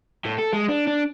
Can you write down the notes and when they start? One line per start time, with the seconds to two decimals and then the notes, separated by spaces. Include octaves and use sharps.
0.25 A2
0.38 A4
0.53 G#3
0.68 D4
0.87 D4